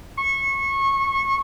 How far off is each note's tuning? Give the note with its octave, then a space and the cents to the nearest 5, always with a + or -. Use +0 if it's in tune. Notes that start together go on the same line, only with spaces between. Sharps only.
C#6 -25